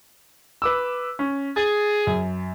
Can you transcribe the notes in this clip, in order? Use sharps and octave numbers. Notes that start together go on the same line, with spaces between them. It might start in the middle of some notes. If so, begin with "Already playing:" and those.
B4 D6 E6
C#4
G#4 A6
F#2